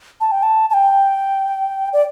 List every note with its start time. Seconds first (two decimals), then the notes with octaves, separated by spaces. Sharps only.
0.21 A5
0.32 G5
0.43 A5
0.70 A5
0.74 G5
1.93 D5